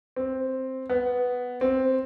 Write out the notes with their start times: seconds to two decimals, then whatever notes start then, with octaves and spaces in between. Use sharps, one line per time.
0.16 C4
0.89 B3
1.61 C4